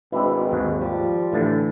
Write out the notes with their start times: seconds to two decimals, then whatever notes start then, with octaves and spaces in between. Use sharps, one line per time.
0.12 G#1 B2 C4 D4 E4
0.52 D#2 G#2
0.81 F3 G3
1.33 A2 D3 E3 A5